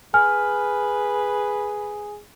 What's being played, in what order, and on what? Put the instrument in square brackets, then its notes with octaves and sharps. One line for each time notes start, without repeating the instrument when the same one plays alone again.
[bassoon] G#4 [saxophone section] B4 [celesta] G#5 F6